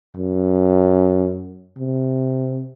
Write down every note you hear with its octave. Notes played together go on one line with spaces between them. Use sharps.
F#2
C3